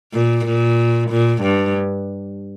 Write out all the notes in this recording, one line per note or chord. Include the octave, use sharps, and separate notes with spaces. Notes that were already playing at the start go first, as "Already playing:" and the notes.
A#2
A#2
A#2
G2